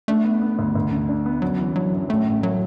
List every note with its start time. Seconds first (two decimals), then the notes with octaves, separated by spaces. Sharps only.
0.08 A3 D4
0.24 B3
0.42 B3
0.59 D2
0.75 D2
0.92 D3
1.09 D4
1.26 B3
1.42 F#2 F#3
1.59 E3
1.75 F#3 D4
1.93 F#2
2.09 A2 A3
2.26 A1
2.43 F#3 A3